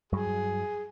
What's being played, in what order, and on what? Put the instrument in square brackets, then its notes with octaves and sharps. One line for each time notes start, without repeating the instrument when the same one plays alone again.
[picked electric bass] G2 F#3 [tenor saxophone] G#4